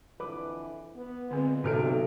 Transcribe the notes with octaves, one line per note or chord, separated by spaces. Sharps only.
F2 D3 E3 B4 D6
B3
A#2 D3 G#3 C4
B1 F#2 C3 A4 F6 D7